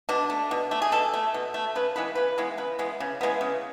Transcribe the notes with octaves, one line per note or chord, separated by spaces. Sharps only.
B2 D4
A3
B2
A3
G#4
B2 A4
A3
B2
A3
C#3 B4
E3 G#3 B3 B4
C#3 B4
E3 G#3 B3
C#3 B4
E3 G#3 B3
C#3
E3 G#3 B3
C#3